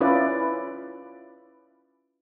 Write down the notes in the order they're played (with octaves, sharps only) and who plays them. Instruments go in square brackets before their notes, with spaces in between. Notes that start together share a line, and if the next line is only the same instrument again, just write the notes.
[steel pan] C#4 E4 F4 B4 D5